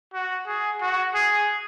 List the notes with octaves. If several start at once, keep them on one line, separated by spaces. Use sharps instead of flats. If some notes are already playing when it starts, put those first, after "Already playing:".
F#4
G#4
F#4
G#4